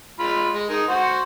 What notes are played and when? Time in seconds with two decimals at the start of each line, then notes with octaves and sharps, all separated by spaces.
0.19 G#3 F4 B5
0.54 G#3
0.69 D#4 G#4 A#4
0.89 F#4 C5 F#5